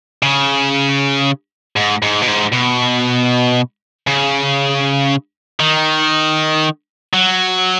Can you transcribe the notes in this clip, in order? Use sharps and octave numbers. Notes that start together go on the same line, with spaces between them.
C#3
G#2
G#2
B2
G#2
B2
C#3
D#3
F#3